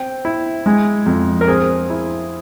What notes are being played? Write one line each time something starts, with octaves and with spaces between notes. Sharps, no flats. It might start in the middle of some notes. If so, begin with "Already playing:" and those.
Already playing: C4 G5
E4
G#3
F2
A#4
C4 G#4
E4